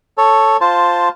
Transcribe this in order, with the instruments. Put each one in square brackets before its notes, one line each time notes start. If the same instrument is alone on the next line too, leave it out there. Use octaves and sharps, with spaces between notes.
[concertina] A4 C#5
F4 C5 A5